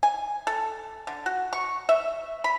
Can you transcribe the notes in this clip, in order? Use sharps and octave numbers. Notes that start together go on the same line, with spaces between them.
G#5
A4
D3
F#4
C#6
E5
B5